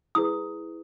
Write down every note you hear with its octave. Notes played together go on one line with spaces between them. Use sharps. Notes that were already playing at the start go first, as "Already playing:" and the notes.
E4 G#4 B4 D#6